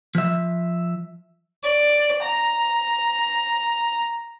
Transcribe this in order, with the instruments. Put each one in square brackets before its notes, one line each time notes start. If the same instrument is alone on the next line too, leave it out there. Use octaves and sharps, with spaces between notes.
[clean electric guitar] F3 E5
[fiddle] D5
A#5